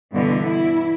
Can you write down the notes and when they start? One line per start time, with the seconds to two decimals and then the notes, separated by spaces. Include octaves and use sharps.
0.12 G2 B2 D3 E3 B3
0.41 E4